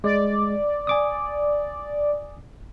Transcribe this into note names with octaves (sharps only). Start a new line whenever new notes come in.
G#3 D5
G#5 D6 D#6